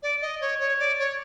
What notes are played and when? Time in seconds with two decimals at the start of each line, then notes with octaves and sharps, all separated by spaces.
0.02 D5
0.21 D#5
0.41 C#5
0.60 C#5
0.79 D5
0.99 C#5